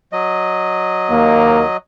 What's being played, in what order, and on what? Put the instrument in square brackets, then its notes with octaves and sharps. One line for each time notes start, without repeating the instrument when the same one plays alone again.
[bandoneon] F#3 D#5
[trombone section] D#2 A#3